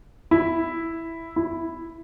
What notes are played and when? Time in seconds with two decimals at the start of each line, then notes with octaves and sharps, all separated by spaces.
0.31 E4
1.36 E4